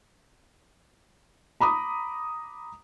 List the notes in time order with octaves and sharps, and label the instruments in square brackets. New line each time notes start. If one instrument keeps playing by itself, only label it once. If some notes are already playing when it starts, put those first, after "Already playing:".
[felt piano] A#5 B5 D6 D#6